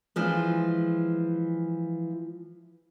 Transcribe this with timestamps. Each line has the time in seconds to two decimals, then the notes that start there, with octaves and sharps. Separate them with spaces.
0.16 E3 F3 G#3